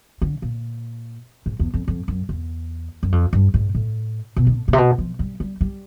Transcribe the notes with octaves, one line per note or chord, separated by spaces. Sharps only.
D3
A#2
G#2
E2
F2
F2
F#2
E2
F#2
F2
G2
G#2
A2
B2
D#3
A2
A#2
C3
B2
F3
G3
G3
G3